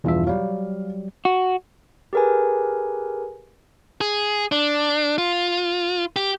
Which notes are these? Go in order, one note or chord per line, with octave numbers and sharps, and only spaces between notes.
E2 G2 B2 E3 F3 E5
F#3 G3 F5
F#4
G4 G#4 A#4 B4 G#5
G#4
D4
F4
G4